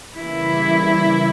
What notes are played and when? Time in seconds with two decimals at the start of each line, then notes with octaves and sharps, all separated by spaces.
0.17 C#3 E3 G3 A#3 E4